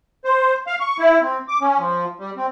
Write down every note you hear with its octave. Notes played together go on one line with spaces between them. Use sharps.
C5
F5
C#6
E4
C4
D6
C#4
F3
G3
C4